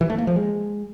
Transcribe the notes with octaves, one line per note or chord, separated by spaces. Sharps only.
E3
A3
A#3
F3
G#3